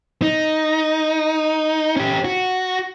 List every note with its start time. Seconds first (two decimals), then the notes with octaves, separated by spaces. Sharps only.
0.22 D#4
1.96 C#4 G4
2.25 F#4